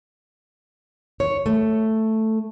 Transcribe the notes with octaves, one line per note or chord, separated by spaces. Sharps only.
C#5
A3